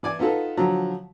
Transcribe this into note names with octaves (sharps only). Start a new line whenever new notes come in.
E3 D5 G#5
B3 D#4 F4 A4 B4
D3 F3 F#3